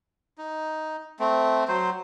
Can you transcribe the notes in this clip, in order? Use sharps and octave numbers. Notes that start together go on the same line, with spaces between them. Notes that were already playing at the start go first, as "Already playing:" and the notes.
D#4
A3 C4
F#3 C5